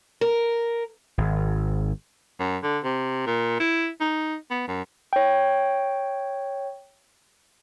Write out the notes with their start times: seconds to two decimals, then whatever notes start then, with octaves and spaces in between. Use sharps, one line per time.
0.21 A#4
1.18 G#1
2.40 F#2
2.63 D3
2.84 C3
3.27 A#2
3.60 E4
4.00 D#4
4.51 B3
4.67 F#2
5.13 C#5 G5